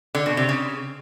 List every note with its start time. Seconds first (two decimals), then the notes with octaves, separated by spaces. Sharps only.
0.15 D3
0.26 B2
0.37 C3
0.49 C#3